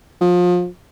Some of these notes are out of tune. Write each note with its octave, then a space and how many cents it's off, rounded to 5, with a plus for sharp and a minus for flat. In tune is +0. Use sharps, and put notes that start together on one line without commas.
F3 +30